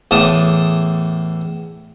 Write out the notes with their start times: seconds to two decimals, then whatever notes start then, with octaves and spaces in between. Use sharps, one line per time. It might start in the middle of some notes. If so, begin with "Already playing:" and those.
0.11 E2 A2 A5 D6 D#6